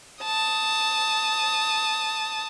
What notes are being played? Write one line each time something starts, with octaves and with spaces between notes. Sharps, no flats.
A5 D#6